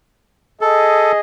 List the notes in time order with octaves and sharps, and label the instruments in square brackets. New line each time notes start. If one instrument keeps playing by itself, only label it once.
[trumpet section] G#4 D#5 [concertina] A4